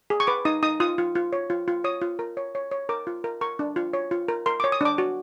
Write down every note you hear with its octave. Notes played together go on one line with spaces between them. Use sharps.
G#4
C#6
B4 D6
D#4 D#6
D#4 D#6
F4 D#6
F4
F4
C#5
F4
F4
C#5 D#6
F4
A#4
C#5
C#5
C#5
A#4 D6
F4
A#4
A#4 C#6
D4
F4
C#5
F4
A#4
A#4 C6
D6
C#5
D#6
D4 D6
F#4